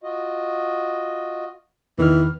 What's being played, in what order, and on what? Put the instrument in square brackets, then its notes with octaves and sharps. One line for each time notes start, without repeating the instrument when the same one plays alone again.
[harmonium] F4 F#4 D#5
[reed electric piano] E2 D#3 F6 [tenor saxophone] E3